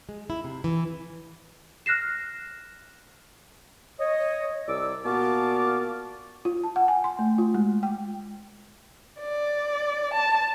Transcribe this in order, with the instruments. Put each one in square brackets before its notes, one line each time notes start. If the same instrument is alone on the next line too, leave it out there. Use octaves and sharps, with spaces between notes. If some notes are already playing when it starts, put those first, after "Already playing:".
[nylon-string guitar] G#3
E4
C3
E3
[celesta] F6 F#6 A#6 C7 E7
[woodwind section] C#5 D#5
C2 D5 D6 E6
A#2 B3 F#4 F5 A5 D6
[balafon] F4
A5
F#5
G#5
C6
A3
F4
G#3
G5
[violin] D5
A5